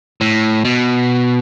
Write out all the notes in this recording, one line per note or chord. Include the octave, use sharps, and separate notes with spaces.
A2
B2